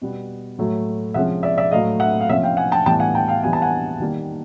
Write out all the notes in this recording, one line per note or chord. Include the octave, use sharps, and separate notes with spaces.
B2 G3 B3
A2 F#3 A3
C3 F3 G#3 C#4 E5 F#5
D5 E5
D5 E5
A2 F#3 A3 D#5 F5
E5 F#5
F5
C3 F3 A#3 C#4 E5 F#5
F5 G5
F#5 G#5
G5 A5
A2 E3 G3 B3 G5 A5
F#5 G#5
G5 A5
F5 G5
E3 G3 B3 G#5
A5
F#5 G#5
D#3 G3 A#3